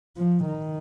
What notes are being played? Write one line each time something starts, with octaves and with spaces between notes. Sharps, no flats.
F3
D#3